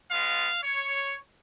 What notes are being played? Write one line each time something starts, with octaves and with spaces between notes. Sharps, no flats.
G#3 B3 F4 F5
C#5